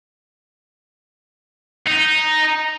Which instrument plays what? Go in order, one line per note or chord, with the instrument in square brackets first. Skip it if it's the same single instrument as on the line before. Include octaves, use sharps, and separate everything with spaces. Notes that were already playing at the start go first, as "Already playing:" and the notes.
[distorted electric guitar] D#4